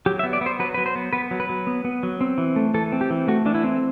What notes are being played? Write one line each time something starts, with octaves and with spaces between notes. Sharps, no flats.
F#3 G4
E5
B3
D5
B3 C5
F#3 B4
F#3 B4
C5
B3
B3 B4
F#3
B4
F#3
B3
B3
F#3
C4
E3
A3
E3 A4
C4
G4
E3
A3 F#4
E3 D4
E4
C4